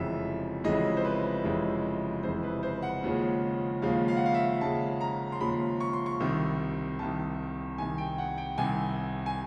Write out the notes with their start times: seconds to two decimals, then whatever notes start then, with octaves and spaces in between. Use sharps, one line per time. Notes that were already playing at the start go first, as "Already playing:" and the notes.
Already playing: F1 F2 C#3 E3 G#3 E5
0.64 F1 F2 C#3 E3 G#3 D#5
0.97 C5
1.05 B4
1.44 F1 F2 C#3 E3 G#3
2.23 F1 F2 C#3 E3 G#3 C5
2.43 B4
2.63 C5
2.82 F#5
3.03 D#2 C#3 F3 G#3
3.82 D#2 C#3 F3 G#3 F5
4.08 F5
4.17 F#5
4.26 F5
4.34 E5
4.61 D#2 C#3 F3 G#3 A5
5.01 A#5
5.32 C6
5.41 D#2 C#3 F3 G#3 B5
5.80 C#6
5.93 C6
6.06 C#6
6.20 C2 C3 D#3
6.99 C2 C3 D#3 A5
7.78 C2 C3 D#3 G#5
7.98 G5
8.18 F#5
8.38 G5
8.58 C2 C3 D#3 G#5
9.26 G#5